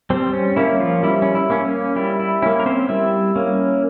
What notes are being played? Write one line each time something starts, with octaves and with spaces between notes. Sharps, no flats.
G3 C4 C5
C#4
A#3 C#4 E4
F3 F4
G3 E4
C#4
E4
A#3 C#4
C#4
G3 E4
E4
A#3 C#4 E4
A#4
C4 C5
G3 E4 E5
A#3 C#4